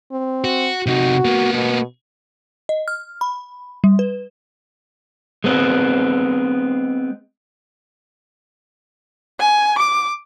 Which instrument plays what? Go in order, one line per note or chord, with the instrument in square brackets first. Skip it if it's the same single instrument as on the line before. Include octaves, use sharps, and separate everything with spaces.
[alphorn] C4
[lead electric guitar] F#4
[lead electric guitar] C3 D#4 [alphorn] F#4
[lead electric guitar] A#3 B3
[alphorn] B2
[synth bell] D#5
F6
B5
G3
B4
[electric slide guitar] G#3 B3 C4
[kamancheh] G#5
D6